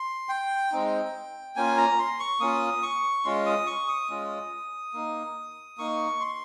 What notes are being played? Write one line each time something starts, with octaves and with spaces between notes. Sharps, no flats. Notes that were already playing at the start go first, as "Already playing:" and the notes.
Already playing: C6
G5
G#3 C4 D#4
A#3 C#4 F4 G#5
A#5
C6
C#6
A#3 C#4 F4 D#6
C#6
G#3 C#4 F4 C6
D#6
C#6
D#6
G#3 C#4 F4
A#3 D#4
A#3 D#4 C#6
C6